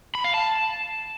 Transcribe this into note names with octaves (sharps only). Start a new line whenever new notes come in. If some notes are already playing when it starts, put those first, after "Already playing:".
B5
F5
A5